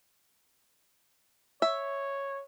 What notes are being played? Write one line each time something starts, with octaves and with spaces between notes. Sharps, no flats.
C#5 E5